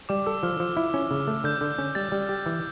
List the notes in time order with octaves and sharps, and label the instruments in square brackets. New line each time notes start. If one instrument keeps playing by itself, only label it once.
[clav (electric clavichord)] G3 [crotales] D6
[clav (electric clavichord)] A4 [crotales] E6
[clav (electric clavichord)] F3 [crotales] F6
[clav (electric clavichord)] F3
E4
C#4
C#3
A3
[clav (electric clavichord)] D3 [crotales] G6
[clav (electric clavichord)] D3
C#4
[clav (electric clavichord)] G3 [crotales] A6
[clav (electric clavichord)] G3
G4
E3